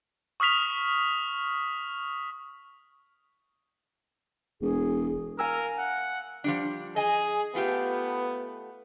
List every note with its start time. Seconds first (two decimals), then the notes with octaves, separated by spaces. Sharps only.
0.40 C#6 D#6 F6 B6 F7
4.62 E1 G#4
5.39 A#4 F5 G#5 E6
5.79 F#5
6.44 F3 G3 D4
6.96 G#4 D#5 G#5
7.55 A3 B3 F4 G4